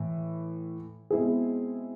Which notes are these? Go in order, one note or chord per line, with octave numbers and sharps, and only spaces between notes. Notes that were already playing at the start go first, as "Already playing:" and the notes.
Already playing: A2 E3
B2 G#3 C4 E4 G#4